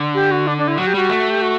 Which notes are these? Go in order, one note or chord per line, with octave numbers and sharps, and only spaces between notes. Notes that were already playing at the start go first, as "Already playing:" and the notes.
Already playing: D3
G4
F#4
D4
D4
E4
F#3 F#4
G4
G3 F#4
A3
G4
F#4